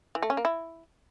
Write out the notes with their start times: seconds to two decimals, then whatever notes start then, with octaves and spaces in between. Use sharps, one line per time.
0.15 E3
0.23 A3
0.30 C#4
0.37 A#3
0.45 E4